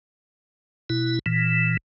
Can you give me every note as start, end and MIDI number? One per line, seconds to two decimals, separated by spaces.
0.90 1.19 47
0.90 1.19 64
1.26 1.77 46
1.26 1.77 52